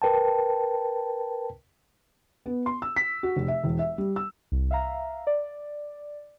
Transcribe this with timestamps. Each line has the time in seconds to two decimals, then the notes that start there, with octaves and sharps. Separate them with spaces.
0.02 A#4 B4 G5 A5
2.46 B3
2.66 C6
2.82 E6
2.96 B6
3.23 F#4
3.36 F1
3.48 E5
3.64 E1
3.79 E5
3.98 G3
4.16 E6
4.52 C2
4.71 E5 F5 A#5
5.27 D5